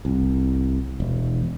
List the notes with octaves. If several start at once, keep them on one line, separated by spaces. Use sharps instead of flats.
C2
E1